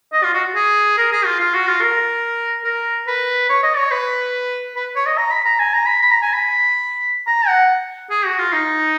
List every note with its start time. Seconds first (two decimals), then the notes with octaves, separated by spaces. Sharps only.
0.13 D#5
0.24 F4
0.34 F#4
0.55 G#4
0.98 A#4
1.12 G#4
1.26 F4
1.40 F4
1.54 F#4
1.68 F4
1.81 A#4
2.65 A#4
3.07 B4
3.49 C#5
3.63 D#5
3.77 C#5
3.91 B4
4.76 B4
4.96 C#5
5.06 D#5
5.18 A#5
5.31 B5
5.45 A#5
5.59 G#5
5.74 A#5
5.86 B5
6.02 B5
6.11 A#5
6.22 G#5
6.33 B5
7.27 A#5
7.48 F#5
8.10 G#4
8.25 F#4
8.39 F4
8.53 D#4